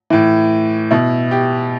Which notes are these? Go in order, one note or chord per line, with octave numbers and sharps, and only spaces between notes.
A2 E3
B2 E4
G4